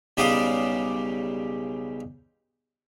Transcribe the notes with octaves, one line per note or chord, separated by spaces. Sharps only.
B1 C#3 G3 G4 F5 D#6